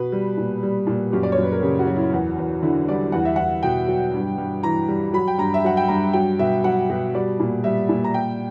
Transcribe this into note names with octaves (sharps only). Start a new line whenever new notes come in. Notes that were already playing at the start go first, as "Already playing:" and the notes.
Already playing: B2 B4
G3
A#2
G3
A#2
F#2 G4
D5
C#5
F#2 B4
A#4
C#3 G4
F#4
F#3
E4
E2
E2
D3 E4
G3 D5
E2 F#5
E5
E2 F#5
B2 G5
F#3
G2
G2
E3 A#5
G3
F#3 B5
G5
G2 A#5
E5
F#3 F#5
G5
G2 A#5
F#3 G5
B2 E5
F#3 F#5
B2
G3 D5
A#2
G3 E5
A#2
A#5
G3 G5